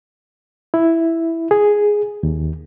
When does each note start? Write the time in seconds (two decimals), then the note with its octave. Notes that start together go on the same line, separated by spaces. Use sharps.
0.74 E4
1.51 G#4
2.23 D#2